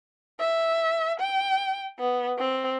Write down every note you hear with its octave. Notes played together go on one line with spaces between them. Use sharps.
E5
G5
B3
C4